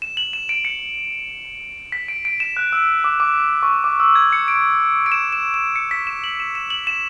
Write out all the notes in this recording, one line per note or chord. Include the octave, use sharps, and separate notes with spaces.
E7
F#7
E7
D7
C#7
B6
D7
D7
E7
F#6
E6
D6
D6
C#6
D6
E6
G#6
C#7
D7
D7
E7
E7
E7
C#7
B6
E7
F#7
E7
E7
F#7
E7